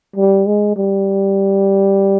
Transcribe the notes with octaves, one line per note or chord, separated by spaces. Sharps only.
G3
G#3
G3